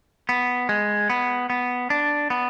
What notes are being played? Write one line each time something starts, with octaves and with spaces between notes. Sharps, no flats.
B3
G#3
B3
B3
D4
B3